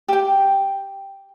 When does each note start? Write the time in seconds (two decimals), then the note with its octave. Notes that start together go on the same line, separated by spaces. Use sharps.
0.08 G4 G5